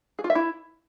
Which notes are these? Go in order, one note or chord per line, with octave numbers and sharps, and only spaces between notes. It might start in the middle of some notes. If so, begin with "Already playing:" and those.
G#4
F4
E5
E4